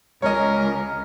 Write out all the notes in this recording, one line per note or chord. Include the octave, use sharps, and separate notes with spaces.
C#2 C#4 A#4 C#5 D#5